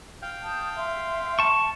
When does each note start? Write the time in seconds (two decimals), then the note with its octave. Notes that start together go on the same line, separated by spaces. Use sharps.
0.22 F5 G5
0.42 A5 D#6 G6
0.76 E5 C6
1.39 A5 C#6